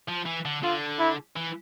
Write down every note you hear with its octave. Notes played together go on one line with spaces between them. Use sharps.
F3
E3
D3
D3 F4
E4
E3